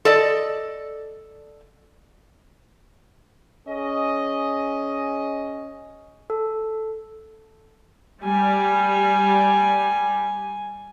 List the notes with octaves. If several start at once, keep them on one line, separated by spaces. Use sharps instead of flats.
A4 D5 D#5
C#4 G#4 D#5
A4
G3 G#5